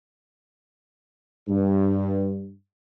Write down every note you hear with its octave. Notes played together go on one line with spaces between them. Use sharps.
G2